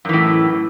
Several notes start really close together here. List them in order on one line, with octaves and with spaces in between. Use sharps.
F#2 E3 A2